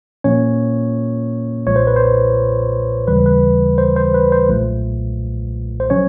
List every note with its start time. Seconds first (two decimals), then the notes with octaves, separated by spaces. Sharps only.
0.24 A#2 F3 A#3 C#4 C#5
1.67 B1 A#2 F3 G#3 C#5
1.76 C5
1.87 B4
1.96 C5
3.08 D#2 C#3 E3 G3 B4
3.26 B4
3.78 C5
3.96 C5
4.14 B4
4.32 C5
4.49 B1 A#2 F3 A3
5.80 C5
5.90 D3 F#3 C#4 C#5